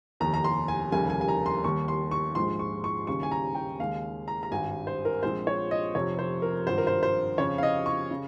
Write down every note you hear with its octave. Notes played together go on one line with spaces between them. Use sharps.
F1 D#2 D#3 A#5
A#5
C6
G#5
F1 D#2 C#3 G3 A#3 G#5
G#5
G#5
A#5
C6
D#2 D#3 G3 C#6
C6
C#6
A#1 G#2 F3 G#3 C6
C#6
C#6
D#2 C#3 G3 C#6
G#5
A#5
G5
D#2 C#3 G#3 F5
A#5
A#5
G#1 G2 G3 G#5
C5
A#4
A#1 A#2 F3 G#3 C4 C5
C#5
D#5
F1 F2 C3 C#5
C5
A#4
G#1 G2 F3 C5
A#4
C5
C5
F2 C#3 F3 C#5
F5
D#5
C#6
C#3